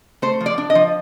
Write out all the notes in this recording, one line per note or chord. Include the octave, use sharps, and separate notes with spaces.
A3 C5
F3
D5
D4
D#5
F3